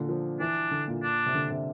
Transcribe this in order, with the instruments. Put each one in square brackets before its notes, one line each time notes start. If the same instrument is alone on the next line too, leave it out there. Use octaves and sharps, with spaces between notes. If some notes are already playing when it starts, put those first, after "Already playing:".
Already playing: [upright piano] A#2 D3
F3
[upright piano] E3 [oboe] D4
[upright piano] D3
A#2
[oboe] D4
[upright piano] C3
D3
C3